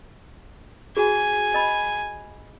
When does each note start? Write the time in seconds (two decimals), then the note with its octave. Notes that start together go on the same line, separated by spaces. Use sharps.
0.97 F#4 G#4 G#5
1.54 D#5 B5